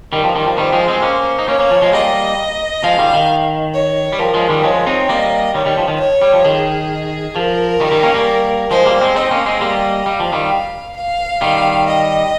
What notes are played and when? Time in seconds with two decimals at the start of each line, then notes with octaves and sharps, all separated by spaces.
0.12 D#3 G3 A#4
0.24 F3
0.35 D#3 G3
0.46 F3
0.58 D#3 G3 C5
0.72 F3 G#3
0.88 G#3 C4
1.02 A#3 C#4
1.39 D#4
1.48 A#3 C#4 C#5
1.60 A#3 C#4
1.71 F3
1.82 F3 G#3
1.93 G3 A#3 D#5
2.84 F3 G#3 F5
2.98 D#3 G3
3.14 D#3
3.74 C#5
4.13 G3
4.19 F3 A#4
4.34 F3 G#3
4.49 D#3 G3
4.64 F3 G#3 C#5
4.86 C4 D#4
5.09 G3 A#3 D#5
5.54 D#3 G3 C#5
5.66 D#3 G3
5.77 F3
5.88 D#3
6.00 C#5
6.22 G3
6.33 F3
6.45 D#3 G#4
7.36 F3 A#4
7.80 D#3 G3
7.91 D#3 G3
8.03 A#3 C#4
8.14 G3 A#3
8.71 F3 G#3 C5
8.86 G3 A#3
9.01 G#3 C4
9.16 C4 D#4 D#5
9.31 A#3 C#4
9.46 G#3 C4
9.61 G3 A#3
10.06 G3 F5
10.20 F3
10.32 D#3 G3
10.96 F5
11.41 D#3 G3
11.87 D#5